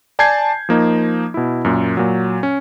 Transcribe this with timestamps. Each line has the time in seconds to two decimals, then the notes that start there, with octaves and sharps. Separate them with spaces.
0.19 D5 G#5 A5 G6 G#6 C7
0.69 F3 A#3 D#4
1.34 B2 E4
1.65 F#2 A#2
1.97 A#2 F#3
2.43 C#4